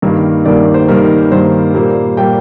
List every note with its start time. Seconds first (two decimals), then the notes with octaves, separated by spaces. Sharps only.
0.02 G2 D#3 G3 A#3 A#4
0.45 G2 D#3 G3 A#3 D5
0.74 C5
0.88 G2 D#3 G3 A#3 A#4
1.31 G2 D#3 G3 A#3 C5
1.74 A#2 G3 A#3
2.17 A#2 G3 A#3 G5